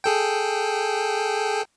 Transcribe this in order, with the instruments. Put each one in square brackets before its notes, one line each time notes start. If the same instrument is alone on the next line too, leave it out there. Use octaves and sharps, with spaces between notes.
[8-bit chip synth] G#4 A4 G5